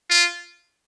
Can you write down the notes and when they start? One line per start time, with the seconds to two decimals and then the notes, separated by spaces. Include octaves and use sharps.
0.10 F4